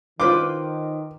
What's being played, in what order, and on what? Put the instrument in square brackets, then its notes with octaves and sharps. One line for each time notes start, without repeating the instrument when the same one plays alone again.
[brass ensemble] D#3 [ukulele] F4 B4 C5 [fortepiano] D6